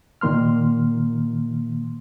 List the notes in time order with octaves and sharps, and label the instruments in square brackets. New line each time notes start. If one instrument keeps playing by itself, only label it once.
[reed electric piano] A#2 D#3 A#3 C6 F6